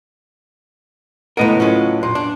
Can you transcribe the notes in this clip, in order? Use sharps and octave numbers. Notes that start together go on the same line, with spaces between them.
C#2 A2 B3 A#4 B4 D#5 F#5 D#7
F#3 C#4 F4
A#2 C6
D4